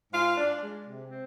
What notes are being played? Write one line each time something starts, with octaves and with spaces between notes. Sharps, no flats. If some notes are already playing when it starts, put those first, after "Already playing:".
G#2 F4 F5
D4
G#3
C3
C4